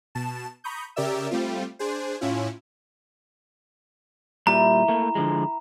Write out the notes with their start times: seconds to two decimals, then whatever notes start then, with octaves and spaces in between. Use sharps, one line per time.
0.15 B2 A5 E7
0.64 A#5 B5 C#6 D#6 G6
0.96 C#3 G4 A#4 D5 E5 E6
1.31 G3 A3 C4 F4
1.79 D4 G#4 C5
2.21 A2 C#4 E4 F4
4.47 A#2 G3 E4 A#5
4.88 A3 A#3
5.15 D3 F3 G#3